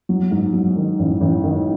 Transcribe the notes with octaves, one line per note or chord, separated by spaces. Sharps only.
F#3
G#2
F#3
D#3
A1
A1
D#3